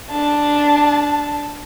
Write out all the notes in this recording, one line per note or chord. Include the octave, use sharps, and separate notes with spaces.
D4 A5